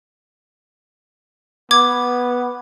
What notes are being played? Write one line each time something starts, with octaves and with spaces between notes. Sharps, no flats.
B3 D6 G#6